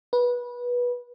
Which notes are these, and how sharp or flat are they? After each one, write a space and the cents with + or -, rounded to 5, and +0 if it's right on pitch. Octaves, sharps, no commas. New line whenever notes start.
B4 -20